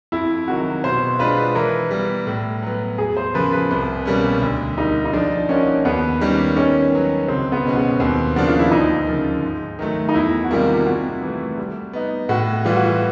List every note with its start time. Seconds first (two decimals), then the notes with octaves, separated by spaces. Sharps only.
0.12 F2 E4
0.47 C3 D#3 F#3 F#4
0.84 B2 C5
1.19 G#3 B3 D4 F4 B4
1.55 E3 A#4
1.91 G3 B3
2.27 A2
2.62 F#3 B3
2.98 E2 G#4
3.17 C5
3.34 C#3 F3 A#3 B4
3.52 B4
3.71 C2
4.05 B2 G3 A#3 C#4
4.41 D2
4.78 D3 G3 A#3 D#4
5.05 D#4
5.13 F3 D4
5.49 A#3 C#4 D#4 F#4
5.85 D#2 B3
6.21 D#3 G3 A#3 C#4
6.56 D#3 C#4
6.92 F#3 B3
7.28 C#2 C4
7.52 B3
7.64 B2 G#3 C#4 F#4
7.76 B3
8.00 D#2 C4
8.35 C#3 F3 A#3 D4 F#4
8.48 F4
8.59 E4
8.71 D2 D#4
9.07 C#3 F3 A#3
9.43 G#2
9.79 D#3 F#3 A3
10.09 D#4
10.14 E2 E4
10.44 F#4
10.50 C3 D#3 G3 A#3 F4
10.86 C3 F#4
11.22 E3 A3
11.58 G3
11.93 B3 D#4
12.29 A2 F#4
12.65 E3 G3 F4
12.76 F#4
12.86 F4